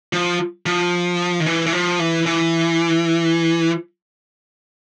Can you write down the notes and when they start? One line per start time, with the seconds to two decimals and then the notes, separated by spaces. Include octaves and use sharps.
0.13 F3
0.66 F3
1.40 D#3
1.46 E3
1.66 E3
1.73 F3
1.99 E3
2.26 E3